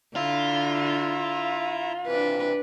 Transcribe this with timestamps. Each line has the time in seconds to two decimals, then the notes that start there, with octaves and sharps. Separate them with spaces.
0.16 D3 E4 F4 E5 A#5
2.07 C3 E3 D4 B4